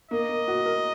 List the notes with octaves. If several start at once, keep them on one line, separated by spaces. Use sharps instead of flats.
A#3 D#5
A#3
F#4
A#4